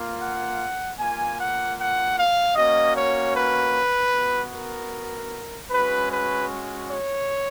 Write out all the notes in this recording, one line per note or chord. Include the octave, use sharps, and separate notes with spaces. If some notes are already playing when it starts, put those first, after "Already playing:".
Already playing: A#3 F4
F#5
A#3 F4 G#5
F#5
F#5
F5
A#3 C#4 F#4 D#5
C#5
B4
B3 F#4
A#4
G#3 C#4 F#4 B4
B4
C#5